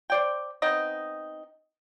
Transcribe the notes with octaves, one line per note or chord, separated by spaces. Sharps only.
C5 D5 G5
B3 C4 D#4 D#5